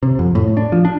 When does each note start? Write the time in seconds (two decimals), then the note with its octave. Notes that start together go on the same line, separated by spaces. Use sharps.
0.03 C3
0.19 F2
0.35 A2
0.57 D4
0.72 F3
0.85 D4